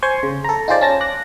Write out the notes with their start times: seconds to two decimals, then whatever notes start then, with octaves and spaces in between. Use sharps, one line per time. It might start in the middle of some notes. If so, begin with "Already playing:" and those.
0.02 C5 G#5 C6 C#6
0.23 C#3
0.44 A4 A#5
0.68 D#4 F4 G#4 C5 D5
0.81 C#4 A5 A#6
1.00 D6 F#6 A#6